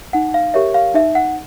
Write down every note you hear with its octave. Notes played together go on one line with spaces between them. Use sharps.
D#4 F#5
F5
G4 A#4 C#5 E5
F5
D#4 E5
F#5